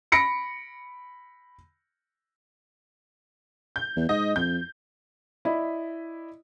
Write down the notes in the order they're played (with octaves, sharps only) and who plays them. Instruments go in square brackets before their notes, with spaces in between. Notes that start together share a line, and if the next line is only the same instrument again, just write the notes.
[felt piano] B5 A#6 C#7 D7
[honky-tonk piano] G6
[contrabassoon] E2
[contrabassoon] G#2 [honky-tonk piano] D#5
[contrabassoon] F2 [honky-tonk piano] G6
[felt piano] E4 D5 D#5 B5